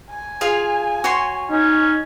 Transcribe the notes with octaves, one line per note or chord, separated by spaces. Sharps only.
G#5
F4 G#4 F5
F#4 C#5 C6
C#4 D#4